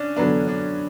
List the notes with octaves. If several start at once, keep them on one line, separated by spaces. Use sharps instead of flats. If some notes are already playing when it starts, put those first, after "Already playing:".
Already playing: C#4 D4
D3 F#3 B3 D4
D4